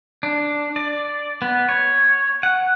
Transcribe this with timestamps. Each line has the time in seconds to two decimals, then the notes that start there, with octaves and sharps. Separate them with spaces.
0.23 D4
0.76 D5
1.42 B3
1.69 C#5
2.43 F#5